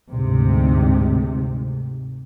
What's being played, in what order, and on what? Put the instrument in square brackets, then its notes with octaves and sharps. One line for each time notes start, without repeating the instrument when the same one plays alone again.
[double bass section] D2 G#2 C3